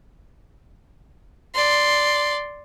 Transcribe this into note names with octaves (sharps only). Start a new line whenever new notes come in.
D5 C6